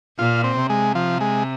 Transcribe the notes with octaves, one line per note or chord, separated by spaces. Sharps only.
A#2 F4
C4
C3
G#3
F3
G#3